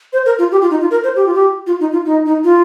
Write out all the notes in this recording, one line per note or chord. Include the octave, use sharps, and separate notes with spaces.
C5
A#4
F4
G4
F4
D#4
F4
A#4
C5
G4
F4
G4
F4
D#4
F4
D#4
D#4
F4